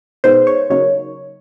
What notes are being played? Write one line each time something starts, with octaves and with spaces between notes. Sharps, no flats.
B2 G#3 B3 D#4 C5
C#5
C#3 F#3 A#3 D#4 C#5